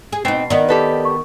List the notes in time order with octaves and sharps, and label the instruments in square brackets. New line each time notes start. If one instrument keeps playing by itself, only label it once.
[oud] G#4
[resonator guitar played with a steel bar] B2 [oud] C4 D#4 [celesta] C7
[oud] D#3 B3 [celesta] D5 D#5
[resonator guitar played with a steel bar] G4 A4 B4
[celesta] C#6